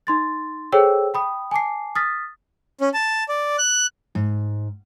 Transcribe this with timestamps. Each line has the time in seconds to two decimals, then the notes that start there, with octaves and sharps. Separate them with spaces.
0.07 D#4 C6 A6
0.72 G#4 A4 C5 C#5 G5 E6
1.14 G5 B5 D#6
1.51 G#5 A5 D6 C7
1.96 D#6 F6 A6 B6
2.81 C#4
2.94 A5
3.29 D5
3.58 F#6
4.15 G#2